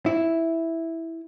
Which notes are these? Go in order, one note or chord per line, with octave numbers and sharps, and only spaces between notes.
E4